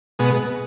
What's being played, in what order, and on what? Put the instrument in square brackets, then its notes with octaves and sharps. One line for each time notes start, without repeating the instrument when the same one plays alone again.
[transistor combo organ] B2 G#3 B3